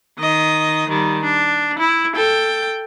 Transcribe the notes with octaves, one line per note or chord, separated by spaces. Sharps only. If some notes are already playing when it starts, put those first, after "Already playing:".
D#3 D#5
D#3 G3
D4
E4
A4 G5